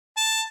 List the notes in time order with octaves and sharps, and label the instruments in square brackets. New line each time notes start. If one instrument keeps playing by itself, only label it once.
[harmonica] A5